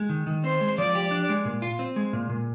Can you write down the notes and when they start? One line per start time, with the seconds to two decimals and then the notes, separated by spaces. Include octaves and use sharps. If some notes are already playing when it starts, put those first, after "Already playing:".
Already playing: G#3
0.09 D#3
0.27 D#3
0.44 C4 C5
0.61 G#3
0.77 F3 D5
0.95 G4
1.11 D4
1.29 G#3
1.45 A#2
1.62 F4
1.79 C4
1.96 G#3
2.13 A#2
2.30 A#2